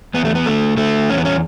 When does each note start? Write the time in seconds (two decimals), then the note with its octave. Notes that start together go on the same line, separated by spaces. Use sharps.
0.14 E2 B3
0.25 A3
0.35 B3
0.46 D3 A3
0.77 D3 A3
1.10 E2 C#4
1.18 B3
1.25 C#4